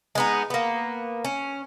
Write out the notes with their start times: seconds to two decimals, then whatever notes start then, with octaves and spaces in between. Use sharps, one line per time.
0.15 G#3 B3 D#4
0.50 A#3 B3
1.25 C#4